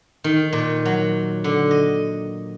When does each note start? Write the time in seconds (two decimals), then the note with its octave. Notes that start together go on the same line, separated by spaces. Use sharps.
0.24 D#3
0.53 A#2
0.85 F#3
1.44 D3
1.71 D#5